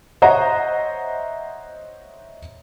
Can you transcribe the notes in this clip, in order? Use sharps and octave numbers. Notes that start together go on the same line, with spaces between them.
C5 C#5 D#5 E5 F#5 A#5